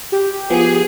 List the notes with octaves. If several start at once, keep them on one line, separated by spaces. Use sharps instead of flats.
G4
F3 B3 G#4